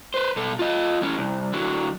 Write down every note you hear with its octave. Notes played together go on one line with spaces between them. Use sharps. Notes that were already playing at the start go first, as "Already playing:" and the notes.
B4 C5
B2 A4
F4 D#5
E3 C#4
C2
D3 F#3